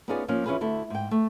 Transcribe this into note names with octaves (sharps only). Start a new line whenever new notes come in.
B3 C#4 D#4 F4 G#4 D5
F3 A#3 C#4 D#4
E3 C#4 E4 F4 G#4 B4
D2 E4 A4
G#2 G5
A3